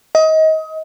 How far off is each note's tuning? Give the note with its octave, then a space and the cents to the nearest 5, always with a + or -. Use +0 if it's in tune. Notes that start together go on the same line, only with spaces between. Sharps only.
D#5 +25